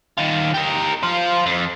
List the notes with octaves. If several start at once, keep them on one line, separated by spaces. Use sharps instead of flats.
D#3 F4
G4 A#4
F4 C5
F2